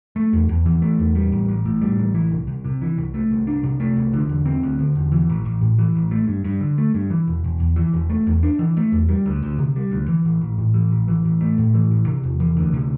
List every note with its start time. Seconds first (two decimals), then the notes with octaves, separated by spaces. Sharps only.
0.16 A3
0.33 E2
0.49 E2
0.66 E3
0.82 A3
0.99 E2
1.15 G3
1.32 A1
1.48 A1
1.65 A2
1.82 G3
1.98 A1
2.14 E3
2.31 C2
2.47 C2
2.65 C3
2.81 E3
2.98 C2
3.14 A3
3.31 C2
3.47 D4
3.64 C3
3.80 A3
3.96 C2
4.13 D3
4.29 E1
4.46 C4
4.63 D2
4.79 D3
4.95 E1
5.12 E3
5.29 A1
5.45 A1
5.61 A2
5.79 E3
5.95 A1
6.11 A3
6.28 G2
6.45 G2
6.61 D3
6.78 A3
6.94 G2
7.10 E3
7.27 E1
7.44 E1
7.60 E2
7.76 E3
7.93 E1
8.10 A3
8.27 E2
8.43 D4
8.59 E3
8.77 A3
8.92 E2
9.09 G3
9.26 D2
9.43 D2
9.59 C3
9.76 G3
9.92 D2
10.08 E3
10.25 A1
10.41 A1
10.58 A2
10.74 E3
10.91 A1
11.08 E3
11.25 A1
11.41 A3
11.58 A2
11.74 E3
11.90 A1
12.06 C3
12.24 E1
12.40 E3
12.57 D2
12.73 C3